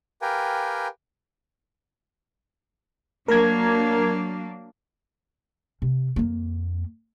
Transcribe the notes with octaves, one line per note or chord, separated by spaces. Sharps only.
G4 A#4 B4 F5 G5 G#5
F#3 A#3 D4 A#4 A#5 G#6
C3
F2 A#3